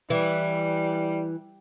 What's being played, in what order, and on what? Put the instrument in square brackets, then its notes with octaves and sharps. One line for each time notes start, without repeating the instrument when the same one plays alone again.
[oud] E3 [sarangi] G3